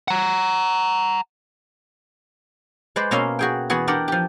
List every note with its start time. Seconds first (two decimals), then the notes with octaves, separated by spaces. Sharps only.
0.08 F#5 A#5
2.96 G#3 B4 C5 D5
3.11 B2 A#3 C#4 E5 F5 C6
3.39 F#4 G#4 G5
3.70 E2 B3 F#4 G#4
3.88 D4 G4 A#4 D5 F#5
4.08 F3 G4